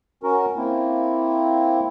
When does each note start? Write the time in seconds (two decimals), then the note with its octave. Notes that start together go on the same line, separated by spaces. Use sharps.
0.23 C#4 F#4 A#4
0.56 A#3 C4 E4